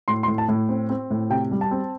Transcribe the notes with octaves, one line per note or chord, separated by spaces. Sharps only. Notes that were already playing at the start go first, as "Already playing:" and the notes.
A2 C6
C6
A2
A5
A2
C4
C4
A2
C3 G5
G3
A5
C4